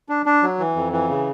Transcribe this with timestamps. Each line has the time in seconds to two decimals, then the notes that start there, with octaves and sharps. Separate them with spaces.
0.09 D4
0.26 D4
0.43 F#3
0.59 E3
0.76 F2
0.93 E3
1.09 C#3